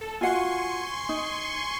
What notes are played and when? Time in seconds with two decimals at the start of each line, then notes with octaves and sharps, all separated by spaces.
0.01 A4
0.21 F4 F#4 F#5 G#5 C6 C#6
1.09 D#4